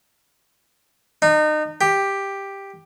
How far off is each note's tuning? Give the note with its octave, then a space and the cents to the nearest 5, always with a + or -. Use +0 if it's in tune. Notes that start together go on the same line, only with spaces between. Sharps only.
D#4 -30
G4 +5